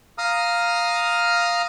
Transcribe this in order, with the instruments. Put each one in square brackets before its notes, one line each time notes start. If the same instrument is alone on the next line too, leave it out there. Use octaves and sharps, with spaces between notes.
[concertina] F5 A#5 D#6 F6